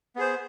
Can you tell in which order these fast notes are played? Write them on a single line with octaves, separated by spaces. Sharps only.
B3 G#4 C5